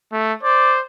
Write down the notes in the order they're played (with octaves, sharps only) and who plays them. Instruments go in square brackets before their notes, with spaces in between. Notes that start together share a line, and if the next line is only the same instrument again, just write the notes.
[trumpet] A3
[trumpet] C5 [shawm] D5